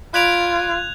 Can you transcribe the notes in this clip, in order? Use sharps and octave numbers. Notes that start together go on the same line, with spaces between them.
F4 D5 B5 F#6 G#6 F7